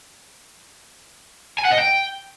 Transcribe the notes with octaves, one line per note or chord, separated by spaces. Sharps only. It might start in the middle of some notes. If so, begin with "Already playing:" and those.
G#5
F#5
D#5
G5